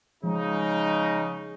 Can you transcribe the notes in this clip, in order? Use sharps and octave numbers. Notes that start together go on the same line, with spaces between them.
C#3 F3 G#3 D#4